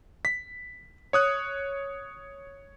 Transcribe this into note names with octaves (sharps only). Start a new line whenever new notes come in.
B6
C#5 D#6 F#6